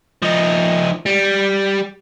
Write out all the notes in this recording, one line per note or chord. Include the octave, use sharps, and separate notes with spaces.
F3 D#4
G3